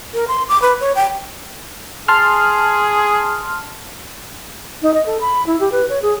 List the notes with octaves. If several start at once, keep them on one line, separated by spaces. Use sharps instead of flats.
A#4
C6
D6
B4
C#5
G5
G#4 A5 C6 F6
D#4
D#5
A4
B5
E4
G4
B4
C#5
G#4